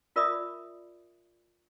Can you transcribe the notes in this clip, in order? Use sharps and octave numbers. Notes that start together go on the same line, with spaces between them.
F4 A#4 D5 E5 B5 D#6